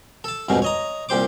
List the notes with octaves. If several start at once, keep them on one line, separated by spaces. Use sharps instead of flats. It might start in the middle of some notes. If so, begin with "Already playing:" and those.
A4 A5
C2 F2 G#2 B2 C#4
C#5 D#5 A#5
C2 A#2 G4 C5 D6